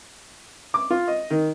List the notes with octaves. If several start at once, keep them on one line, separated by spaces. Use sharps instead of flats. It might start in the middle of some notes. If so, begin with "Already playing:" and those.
D6
F4
D#5
D#3